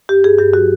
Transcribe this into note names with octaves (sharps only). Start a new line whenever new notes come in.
G2 G4
G2 G#4
G2 G4
F#3 F#4